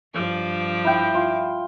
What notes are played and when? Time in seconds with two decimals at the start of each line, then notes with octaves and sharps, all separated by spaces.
0.14 G2 F3 D6
0.84 E4 G5
1.14 F4